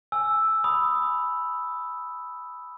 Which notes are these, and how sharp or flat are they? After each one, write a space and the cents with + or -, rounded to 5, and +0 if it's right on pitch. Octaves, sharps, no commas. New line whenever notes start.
G#5 +10 E6 +0
B5 +0 D#6 +0